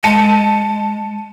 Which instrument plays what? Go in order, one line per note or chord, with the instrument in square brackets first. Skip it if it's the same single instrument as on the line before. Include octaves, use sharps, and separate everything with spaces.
[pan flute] G#3 [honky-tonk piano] A5 C#7 D#7